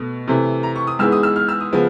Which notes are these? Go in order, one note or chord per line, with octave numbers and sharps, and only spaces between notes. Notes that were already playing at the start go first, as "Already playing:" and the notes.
Already playing: B2 A3
C3 E3 A3
A#5
C#6
D#6
G#2 E3 G#3 B3 E6
D#6
E6
F6
E6
D#6
C#3 F3 G#3 B3